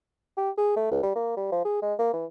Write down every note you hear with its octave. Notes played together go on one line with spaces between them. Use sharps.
G4
G#4
A3
C#2
G3
A#3
G3
F3
G#4
G#3
A#3
E3